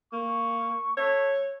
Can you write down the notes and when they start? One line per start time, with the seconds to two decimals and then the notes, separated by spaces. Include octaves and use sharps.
0.13 A#3 C#6
0.97 A3 C#5